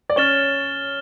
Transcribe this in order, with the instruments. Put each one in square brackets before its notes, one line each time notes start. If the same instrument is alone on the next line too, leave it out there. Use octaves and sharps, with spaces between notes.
[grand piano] D5
[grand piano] C#4 C#5 [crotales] F6 A6 E7 G7